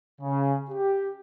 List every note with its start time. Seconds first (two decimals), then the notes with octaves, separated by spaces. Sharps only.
0.21 C#3
0.70 G4